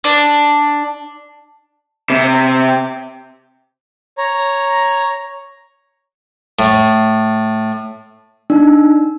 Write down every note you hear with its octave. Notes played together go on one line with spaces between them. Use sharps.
D4
C3
C#5 A#5
A2
D4 D#4